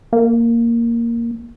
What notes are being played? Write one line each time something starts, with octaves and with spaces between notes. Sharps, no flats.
A#3